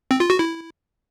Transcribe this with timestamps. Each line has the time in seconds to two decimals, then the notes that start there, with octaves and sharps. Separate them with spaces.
0.11 C4
0.20 F4
0.30 F#4
0.39 E4